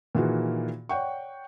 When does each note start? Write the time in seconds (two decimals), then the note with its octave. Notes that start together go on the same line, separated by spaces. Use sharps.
0.15 A#2 D#3 E3 F4 F#4 G#4
0.89 C#5 D5 F#5 G5 C#6